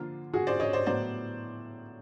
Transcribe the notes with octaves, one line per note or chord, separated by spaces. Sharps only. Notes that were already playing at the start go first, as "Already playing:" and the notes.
Already playing: D3 F3 A#3 F4
F#4 G#4
C5 D5
C#5 D#5
C5 D5
A2 F#3 B3 C5 D5